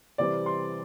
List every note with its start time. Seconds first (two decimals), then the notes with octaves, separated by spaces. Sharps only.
0.18 C3 E3 G3 C4 D5
0.46 C6